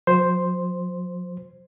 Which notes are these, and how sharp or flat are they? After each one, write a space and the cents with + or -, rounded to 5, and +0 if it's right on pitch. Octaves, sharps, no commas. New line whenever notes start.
F#3 -45 C5 +0